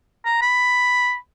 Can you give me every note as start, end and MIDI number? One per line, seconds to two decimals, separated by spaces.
0.25 0.40 82
0.42 1.16 83